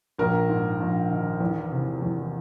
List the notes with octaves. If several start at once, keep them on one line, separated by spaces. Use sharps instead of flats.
A#1 A#4
G#2
A#1
D#3
E2
C3
E2